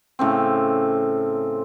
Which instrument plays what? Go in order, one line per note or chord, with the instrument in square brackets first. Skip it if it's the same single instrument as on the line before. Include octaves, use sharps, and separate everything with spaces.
[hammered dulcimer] A2 C#3 C4